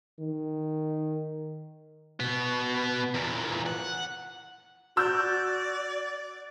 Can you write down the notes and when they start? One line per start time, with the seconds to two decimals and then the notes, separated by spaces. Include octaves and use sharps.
0.19 D#3
2.20 B2 B3
3.14 E2 A#2
3.66 F#5
4.97 F#4 D5 E6 G6